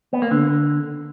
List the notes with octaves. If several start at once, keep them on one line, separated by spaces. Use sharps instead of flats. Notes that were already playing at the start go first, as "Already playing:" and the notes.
B3
A#3
D3